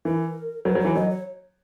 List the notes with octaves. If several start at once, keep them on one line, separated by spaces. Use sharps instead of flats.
E3 A#4
F#3 B4
F#3
E3 C#5
F#3 D#5
C#5